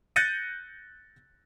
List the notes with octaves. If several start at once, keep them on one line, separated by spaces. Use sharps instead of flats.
F#6 G6 A6 A#6 C#7 D#7